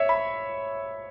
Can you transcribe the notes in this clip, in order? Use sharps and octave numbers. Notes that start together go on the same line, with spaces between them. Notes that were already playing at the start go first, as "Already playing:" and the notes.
Already playing: C#5 E5
B5